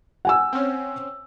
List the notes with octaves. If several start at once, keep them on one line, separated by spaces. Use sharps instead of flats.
F#5 G#5 E6
C4 C#4